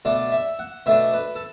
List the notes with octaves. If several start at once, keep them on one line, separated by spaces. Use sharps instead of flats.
B2 A3 D4 D5
E5
F#5
B2 A3 D4 E5
B4
A4